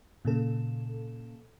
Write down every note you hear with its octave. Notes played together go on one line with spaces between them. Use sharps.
A#2 C#3 A4